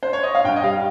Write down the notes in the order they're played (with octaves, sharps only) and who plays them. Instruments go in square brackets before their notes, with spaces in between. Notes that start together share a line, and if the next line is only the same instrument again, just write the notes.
[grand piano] C5
C#5
D#5
F5
G2 G5
D#5
G3 F5